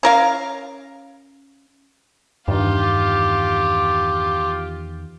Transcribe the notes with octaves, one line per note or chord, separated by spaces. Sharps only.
C#4 A#4 F5
E2 G2 D#3 F4 G4